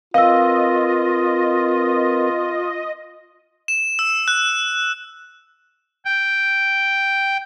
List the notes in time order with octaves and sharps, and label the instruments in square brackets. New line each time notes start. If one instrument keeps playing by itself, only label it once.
[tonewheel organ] C4 A#4 B4 [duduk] F4 [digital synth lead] D#5 [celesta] F5 E6
[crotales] E7
E6
F#6
[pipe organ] G5